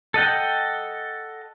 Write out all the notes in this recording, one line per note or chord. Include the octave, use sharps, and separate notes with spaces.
A4 D#5 F#5 G5